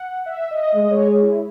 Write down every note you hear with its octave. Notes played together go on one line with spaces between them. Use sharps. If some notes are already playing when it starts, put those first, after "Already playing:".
Already playing: F#5
E5
D#5
G#3 D#5
C#5
G#4
E4